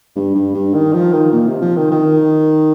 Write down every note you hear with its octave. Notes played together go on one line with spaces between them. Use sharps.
G2
G2
G2
D#3
F3
D#3
A#2
C3
F3
D#3
D#3